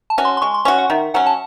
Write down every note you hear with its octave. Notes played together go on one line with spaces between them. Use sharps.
A5
C#4 F#4
C6
C6
G#3 C#6
C6
C#4 F#4 C#6
F#5
D#3 E5
F#3 C#4 F#5
A5